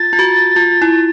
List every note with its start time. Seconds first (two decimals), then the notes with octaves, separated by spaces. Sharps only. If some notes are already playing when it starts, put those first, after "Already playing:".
Already playing: F4 A6
0.13 F4
0.19 F#4
0.56 F4
0.82 E4